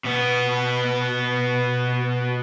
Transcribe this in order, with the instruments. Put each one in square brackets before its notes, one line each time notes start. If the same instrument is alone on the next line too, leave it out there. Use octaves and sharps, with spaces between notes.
[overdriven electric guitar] B2 B3